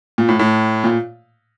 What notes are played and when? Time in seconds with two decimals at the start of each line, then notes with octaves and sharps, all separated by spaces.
0.18 A#2
0.29 A2
0.39 A2
0.84 A#2